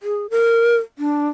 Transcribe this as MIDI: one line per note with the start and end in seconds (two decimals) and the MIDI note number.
0.03 0.30 68
0.30 0.76 70
0.98 1.27 62